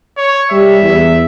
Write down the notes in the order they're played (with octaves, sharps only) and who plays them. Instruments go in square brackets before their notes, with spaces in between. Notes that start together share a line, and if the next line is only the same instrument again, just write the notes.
[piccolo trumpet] C#5
[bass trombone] G3 [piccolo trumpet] E5
[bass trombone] E2